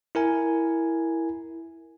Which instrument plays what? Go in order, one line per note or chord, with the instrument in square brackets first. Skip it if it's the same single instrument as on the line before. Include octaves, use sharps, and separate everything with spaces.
[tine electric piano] E4 A#4 G#5